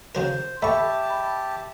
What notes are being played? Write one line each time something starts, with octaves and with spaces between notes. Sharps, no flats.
C#3 F#3 A#4 C5
A3 G4 E5 A5 B5 C#6
D#5 B5